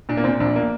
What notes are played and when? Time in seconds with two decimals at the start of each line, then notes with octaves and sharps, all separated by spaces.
0.09 A#2 D4
0.17 A#3
0.24 A#2 C4
0.40 A#1 D4
0.56 A#3